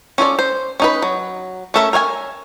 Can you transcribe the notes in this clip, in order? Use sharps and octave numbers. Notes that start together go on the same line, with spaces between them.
C#4 F4 A4 D5
C5
C#4 D#4 B4
F#3
A3 C#4 A4 A#4 E5
A#4 C#5 F5 G#5